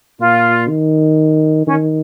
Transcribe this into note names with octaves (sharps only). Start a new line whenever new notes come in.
A#2 F4
D#3
D#3 C#4